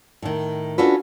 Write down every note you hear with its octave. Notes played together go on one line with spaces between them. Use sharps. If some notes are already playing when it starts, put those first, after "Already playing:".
A2 D#3
C#4 D4 F4 F#4 A4 B4